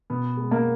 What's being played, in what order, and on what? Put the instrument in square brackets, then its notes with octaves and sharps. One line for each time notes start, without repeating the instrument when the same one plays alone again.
[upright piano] B2 B3
G#3
A#3